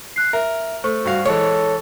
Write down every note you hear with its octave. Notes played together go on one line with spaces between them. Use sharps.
F#6 C7
A#4 E5
A3 C5 C#6
G2 F#4 F5
E3 G#3 A4 C#5